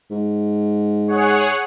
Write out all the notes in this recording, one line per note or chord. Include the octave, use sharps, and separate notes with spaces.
G#2
G#4 C#5 F#5